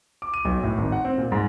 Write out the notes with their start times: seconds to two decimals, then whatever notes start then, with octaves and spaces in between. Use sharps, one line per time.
0.22 D6
0.34 D#7
0.45 B1
0.63 A2
0.78 G#1
0.92 F#5
1.05 C4
1.18 A#2
1.32 G#2